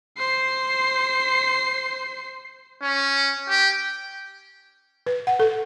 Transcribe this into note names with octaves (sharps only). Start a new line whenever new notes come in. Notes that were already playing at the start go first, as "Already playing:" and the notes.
C5 C7
C#4
G4
B4
F#5
A4